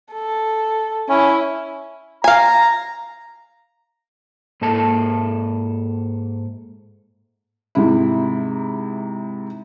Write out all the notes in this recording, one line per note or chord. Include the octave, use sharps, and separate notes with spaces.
A4
C#4 E4
F5 G#5 A#5
G#2 A#3 A4 A5
G#2 C3 E4